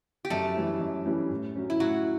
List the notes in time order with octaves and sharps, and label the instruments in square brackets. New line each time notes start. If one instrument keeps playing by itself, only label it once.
[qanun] G4
[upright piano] F#2 [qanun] A3 A4
[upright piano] E3 G3 C#4 E4
F#2
E3 G3 C#4 E4
A2
F#3 C#4
[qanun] E4
[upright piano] A2 [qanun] F#3 F#4